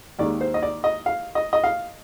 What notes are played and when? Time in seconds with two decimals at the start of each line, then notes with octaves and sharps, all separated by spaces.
0.19 D#2 D#3 G#3 D5
0.41 C5
0.54 D#5
0.62 D5
0.84 D#5
1.06 F5
1.35 D#5
1.53 D#5
1.64 F5